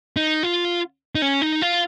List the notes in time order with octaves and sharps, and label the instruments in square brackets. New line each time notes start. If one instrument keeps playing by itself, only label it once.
[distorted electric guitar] D#4
F4
D#4
C#4
D#4
F4